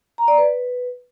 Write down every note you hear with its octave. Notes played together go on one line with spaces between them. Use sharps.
A#5
D5
B4